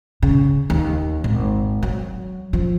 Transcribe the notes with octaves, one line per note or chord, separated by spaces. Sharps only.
C#3
D#2
G#1
F#3
F3